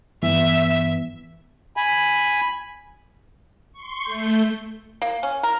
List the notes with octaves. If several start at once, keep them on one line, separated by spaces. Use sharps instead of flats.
G2 E3 B3 E5
G#5 B5
C6 C#6
A3 G6
A#3
C#4
A#4